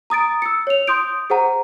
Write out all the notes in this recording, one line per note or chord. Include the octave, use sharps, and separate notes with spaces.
A#5 D#6 A6 D7
E6 C#7
C#5 F7
C6 D#6 G6 D7
G#4 C5 F#5 A#5